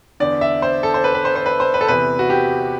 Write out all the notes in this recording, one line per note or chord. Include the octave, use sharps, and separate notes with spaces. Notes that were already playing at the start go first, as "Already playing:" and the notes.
E2 D3 D5
E5
C5
A4
C5
B4
B4
C5
C5
B4
C5
B4
A4
E2 C3 E3 B4
F#4
G4